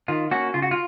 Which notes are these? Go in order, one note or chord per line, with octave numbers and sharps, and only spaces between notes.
D#3 F4
A#3 C#4 F#4
C#3 F4
F#4
F4